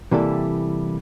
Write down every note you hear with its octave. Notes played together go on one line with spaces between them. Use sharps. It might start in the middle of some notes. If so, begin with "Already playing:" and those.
C3 E3 G3 A#3 E4 A4